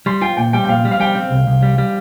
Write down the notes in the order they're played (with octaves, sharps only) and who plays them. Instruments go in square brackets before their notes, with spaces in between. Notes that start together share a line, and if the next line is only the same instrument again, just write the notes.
[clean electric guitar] G3 [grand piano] C6
[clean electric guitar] F4 [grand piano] G5
[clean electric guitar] A#2 [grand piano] G5
[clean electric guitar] G3 [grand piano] G5
[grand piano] G5
[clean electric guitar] A#2 [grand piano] F5
[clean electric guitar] G3
[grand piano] F5
[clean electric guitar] G3 [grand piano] G5
[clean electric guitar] C4
C2
C2
G3
G3